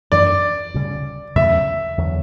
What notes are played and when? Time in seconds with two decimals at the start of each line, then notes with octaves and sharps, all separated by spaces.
0.12 F#2 E3 A3 D4 D5
0.74 D2 C#3 G3
1.36 E2 C#3 F#3 A3 E5
1.98 E2 D3 F#3